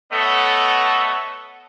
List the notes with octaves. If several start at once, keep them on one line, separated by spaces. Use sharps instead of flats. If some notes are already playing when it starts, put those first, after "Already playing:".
A3 B3 A4 C#5 D#5 F#5